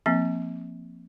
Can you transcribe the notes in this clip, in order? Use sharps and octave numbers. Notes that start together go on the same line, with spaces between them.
F3 A#3 C4